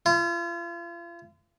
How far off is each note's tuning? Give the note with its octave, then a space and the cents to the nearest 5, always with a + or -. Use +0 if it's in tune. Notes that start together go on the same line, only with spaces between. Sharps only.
F4 -40